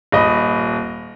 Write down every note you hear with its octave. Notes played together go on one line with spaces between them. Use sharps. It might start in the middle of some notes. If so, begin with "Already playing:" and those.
D#1 D#5 B5